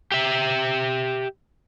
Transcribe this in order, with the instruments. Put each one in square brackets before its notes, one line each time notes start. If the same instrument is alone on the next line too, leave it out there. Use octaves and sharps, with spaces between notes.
[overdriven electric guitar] G4 E5